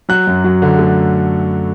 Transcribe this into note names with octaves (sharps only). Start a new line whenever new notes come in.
F#3 F#6
F#2
F#3
D3
A3